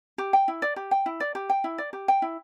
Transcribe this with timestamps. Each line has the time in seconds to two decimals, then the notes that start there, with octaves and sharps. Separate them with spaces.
0.18 G4
0.33 G5
0.48 E4
0.62 D5
0.76 G4
0.91 G5
1.06 E4
1.20 D5
1.35 G4
1.50 G5
1.64 E4
1.78 D5
1.93 G4
2.08 G5
2.22 E4